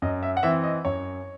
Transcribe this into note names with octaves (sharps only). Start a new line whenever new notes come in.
F#2 D#5
E5
F#5
E3 C4 E5
D#5
F#2 C#5